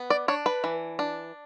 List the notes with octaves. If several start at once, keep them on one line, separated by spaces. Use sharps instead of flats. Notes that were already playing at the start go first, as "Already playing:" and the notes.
Already playing: B3
D5
D4 C#5
B4
E3
D4